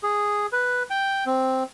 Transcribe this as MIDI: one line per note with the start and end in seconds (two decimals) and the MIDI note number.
0.03 0.46 68
0.52 0.83 71
0.90 1.24 79
1.26 1.64 60